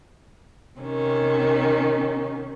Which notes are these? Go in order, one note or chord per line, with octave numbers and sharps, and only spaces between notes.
C3 D#3 C#4